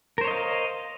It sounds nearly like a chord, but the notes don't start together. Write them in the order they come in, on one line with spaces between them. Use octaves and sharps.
A#4 C5 C#5 D#5 F5